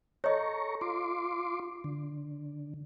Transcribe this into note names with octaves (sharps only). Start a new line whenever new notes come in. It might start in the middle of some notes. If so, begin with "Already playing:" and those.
A4 C#5 D#5 A#5 C#6
F4 C6 D6
D3